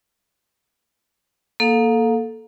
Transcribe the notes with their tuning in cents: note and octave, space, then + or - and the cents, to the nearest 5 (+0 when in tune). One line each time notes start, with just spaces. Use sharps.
A#3 +0 A4 +0 F5 +30